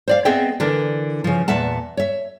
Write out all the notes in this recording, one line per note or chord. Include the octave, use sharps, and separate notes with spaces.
C5 D5 F5
B3 C4 G#4 D#5 E5 G5
D3 E3 D4 A#4
C#3 F3
E2 A#2 E5 F#5 A5
C#5 E5